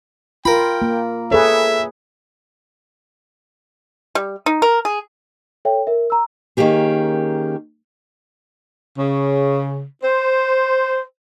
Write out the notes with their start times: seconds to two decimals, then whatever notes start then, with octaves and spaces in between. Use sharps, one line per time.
0.45 F4 A#4 G5 B5
0.82 A#3
1.31 G#4 A4 B4 C#5 E5
4.15 G3
4.46 D#4
4.62 A#4
4.85 G#4
5.65 A4 C#5 E5 G5
5.87 A#4 E5
6.10 A#5 E6
6.57 D#3 A#3 C#4 G4 G#4
8.98 C#3
10.03 C5